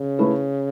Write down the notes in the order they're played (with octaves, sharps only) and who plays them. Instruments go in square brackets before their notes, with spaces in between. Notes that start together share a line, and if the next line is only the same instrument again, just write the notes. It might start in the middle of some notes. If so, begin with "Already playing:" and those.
Already playing: [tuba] C#3
[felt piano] A3 E4 B4